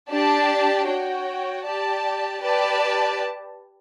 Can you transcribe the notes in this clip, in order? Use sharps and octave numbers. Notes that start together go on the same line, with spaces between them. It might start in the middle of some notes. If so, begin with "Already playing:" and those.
D4 G4 D5 A5
F#4 C#5 G5
G4 D5 A5
G4 B4 D5 A5